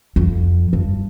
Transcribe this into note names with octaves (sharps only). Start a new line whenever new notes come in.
F2
G2